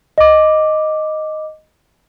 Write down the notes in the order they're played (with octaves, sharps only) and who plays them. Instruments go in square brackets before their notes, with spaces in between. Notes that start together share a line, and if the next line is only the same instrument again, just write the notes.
[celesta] D#5 D6